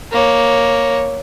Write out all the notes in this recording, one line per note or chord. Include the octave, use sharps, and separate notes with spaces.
A#3 C#5